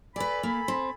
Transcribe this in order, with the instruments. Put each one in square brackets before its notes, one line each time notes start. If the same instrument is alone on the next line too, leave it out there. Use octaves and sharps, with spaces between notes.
[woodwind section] A4 G#5 B5 [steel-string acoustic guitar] B4 D5
[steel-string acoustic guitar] A#3
C4